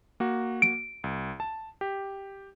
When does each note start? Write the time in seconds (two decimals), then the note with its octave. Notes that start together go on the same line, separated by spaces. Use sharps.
0.20 A#3 F#4
0.62 D7
1.04 C2
1.40 A5
1.81 G4